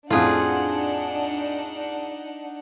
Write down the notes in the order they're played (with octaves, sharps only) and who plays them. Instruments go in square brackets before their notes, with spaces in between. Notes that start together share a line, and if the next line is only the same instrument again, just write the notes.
[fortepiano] F2 A2 [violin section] D4 D#4 F#5 [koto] F4 G#4